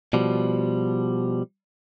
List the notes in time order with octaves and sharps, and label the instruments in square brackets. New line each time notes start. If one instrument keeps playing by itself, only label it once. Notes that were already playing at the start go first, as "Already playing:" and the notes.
[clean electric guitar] B2 F3 G3